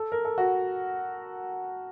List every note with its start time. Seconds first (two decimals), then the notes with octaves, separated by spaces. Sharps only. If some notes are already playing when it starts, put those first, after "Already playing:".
Already playing: A4
0.12 A#4
0.25 A4
0.38 F#4